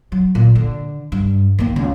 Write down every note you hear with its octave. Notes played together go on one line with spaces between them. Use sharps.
F#3
A#2
D3
G2
D#3 A#3
C#2